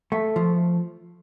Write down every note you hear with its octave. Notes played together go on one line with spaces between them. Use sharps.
A3
F3